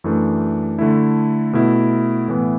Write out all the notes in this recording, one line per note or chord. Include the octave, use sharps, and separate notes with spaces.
F#2 E3 A3 D4
D3 A3 E4
B2 A3 E4
A2 E3 B3